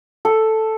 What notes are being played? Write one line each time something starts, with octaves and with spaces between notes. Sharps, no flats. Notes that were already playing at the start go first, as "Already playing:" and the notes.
A4